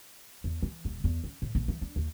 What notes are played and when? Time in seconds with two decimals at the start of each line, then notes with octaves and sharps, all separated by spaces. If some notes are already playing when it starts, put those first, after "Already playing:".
0.44 E2
0.62 E3
0.85 D#1
1.04 E2
1.24 C#4
1.42 A2
1.55 A#1
1.68 E3
1.81 D4
1.96 D#2